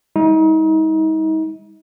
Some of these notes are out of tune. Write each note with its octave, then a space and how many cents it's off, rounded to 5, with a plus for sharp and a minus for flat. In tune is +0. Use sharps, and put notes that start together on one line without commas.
G3 +40 D#4 +40